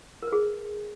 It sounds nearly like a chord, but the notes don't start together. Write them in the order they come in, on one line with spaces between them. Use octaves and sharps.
A#4 B4 G#4